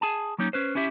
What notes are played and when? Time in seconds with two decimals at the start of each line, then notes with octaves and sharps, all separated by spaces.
0.01 G#4 G#5 A5
0.38 F#3 A#3 C#4 D#4
0.53 C#4 B4 C5
0.75 C#4 E4 G4 E5